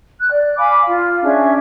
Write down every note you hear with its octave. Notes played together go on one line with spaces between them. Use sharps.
F#6
D5
F5 G#5 B5 D6
F4
C#4 D4 G#4 E5